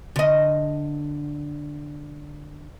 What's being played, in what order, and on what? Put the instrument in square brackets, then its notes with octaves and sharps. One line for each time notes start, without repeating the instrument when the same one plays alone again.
[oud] D3 D#5